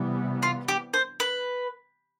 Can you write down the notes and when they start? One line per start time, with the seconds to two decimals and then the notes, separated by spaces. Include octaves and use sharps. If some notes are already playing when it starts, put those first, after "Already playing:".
Already playing: C3 E3 G3 B3
0.43 F4
0.68 G4
0.94 C5
1.20 B4